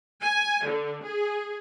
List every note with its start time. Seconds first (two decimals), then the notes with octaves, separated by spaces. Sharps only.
0.23 G#5
0.66 D3
1.04 G#4